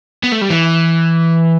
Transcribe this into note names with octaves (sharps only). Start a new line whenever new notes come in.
B3
A3
G3
E3